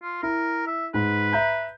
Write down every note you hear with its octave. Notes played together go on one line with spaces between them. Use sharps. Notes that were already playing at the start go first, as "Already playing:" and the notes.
F4
E4 A#4
E5
G#2 B4
E5 A#5 G6